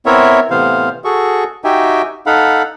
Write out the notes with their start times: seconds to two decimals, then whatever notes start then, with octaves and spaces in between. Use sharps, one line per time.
0.06 B3 C4 E4 A#4 C#5 E5
0.51 A2 C3 E3 B3 C5 F5
1.05 F#4 G#4 A4 C#6
1.64 D#4 F#4 G4 E5 G5 G#5
2.26 D#4 A4 F5 F#5 B5